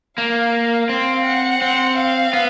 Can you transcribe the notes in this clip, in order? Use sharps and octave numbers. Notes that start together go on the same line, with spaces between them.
A#3 F5
C4 F5
F#5
C4
F5
B3